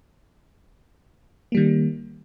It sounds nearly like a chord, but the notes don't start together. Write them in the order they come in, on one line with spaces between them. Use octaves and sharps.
A#3 G3 D#3